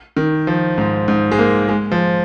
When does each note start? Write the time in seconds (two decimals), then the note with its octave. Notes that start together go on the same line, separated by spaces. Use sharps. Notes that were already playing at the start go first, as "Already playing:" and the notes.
0.17 D#3
0.47 F3
0.78 G#2
1.08 G#2
1.32 G#3
1.39 A#3
1.69 G#3
1.92 F3